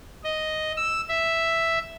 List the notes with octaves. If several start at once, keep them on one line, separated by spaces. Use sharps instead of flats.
D#5
E6
E5